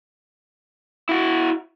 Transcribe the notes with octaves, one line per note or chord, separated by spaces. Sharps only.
E4 F#4